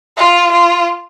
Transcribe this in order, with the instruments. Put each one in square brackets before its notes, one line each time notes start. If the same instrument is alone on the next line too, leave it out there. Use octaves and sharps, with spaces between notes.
[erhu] F4
F4